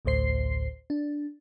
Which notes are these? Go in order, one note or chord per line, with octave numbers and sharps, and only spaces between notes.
A1 D2 A2 C5 C7
D4